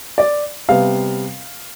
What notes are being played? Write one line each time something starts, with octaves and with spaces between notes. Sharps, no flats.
D5
C3 G3 B3 F5